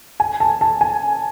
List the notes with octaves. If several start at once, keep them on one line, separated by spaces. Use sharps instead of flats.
G#5
A5
A5
G#5